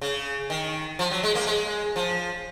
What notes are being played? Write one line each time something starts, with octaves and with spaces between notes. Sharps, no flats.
C#3
D#3
F3
F#3
G#3
A#3
G#3
F3